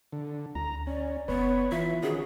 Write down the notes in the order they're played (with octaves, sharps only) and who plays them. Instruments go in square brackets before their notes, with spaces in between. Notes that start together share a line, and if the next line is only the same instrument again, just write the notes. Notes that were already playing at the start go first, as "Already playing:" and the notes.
[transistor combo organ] D3
[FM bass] D2 [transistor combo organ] A#5
[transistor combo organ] C#4 [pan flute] D5
[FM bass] F#1 [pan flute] B3 [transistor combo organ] B4 C#5
[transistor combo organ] E3 [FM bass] F4 [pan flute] E5
[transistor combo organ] D#3 C#4 F#4 [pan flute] G#4